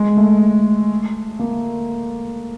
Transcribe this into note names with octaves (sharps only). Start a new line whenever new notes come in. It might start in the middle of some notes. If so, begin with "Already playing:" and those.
Already playing: G#3
A3
A#3